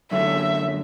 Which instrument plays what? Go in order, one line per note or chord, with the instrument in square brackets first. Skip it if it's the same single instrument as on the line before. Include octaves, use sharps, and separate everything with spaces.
[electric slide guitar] F#2 D3 F#3 A3 [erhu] E5